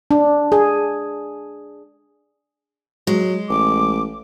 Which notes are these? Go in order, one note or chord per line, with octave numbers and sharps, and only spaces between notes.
D4
G#4
F#3 G#3
A1 D6